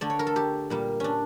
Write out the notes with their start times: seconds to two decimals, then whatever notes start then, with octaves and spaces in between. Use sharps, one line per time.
0.01 D3 A3 D5
0.10 C#5
0.19 A#4
0.27 A4
0.36 G4
0.70 A#2 G3 A#3
1.00 C#4 D4